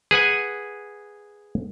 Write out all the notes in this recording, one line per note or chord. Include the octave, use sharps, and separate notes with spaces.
G#4 B4 F#5 G#5